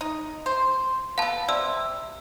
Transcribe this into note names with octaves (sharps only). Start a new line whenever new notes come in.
D#4
C5
B3 A4 F5 A5
C3 D5 E6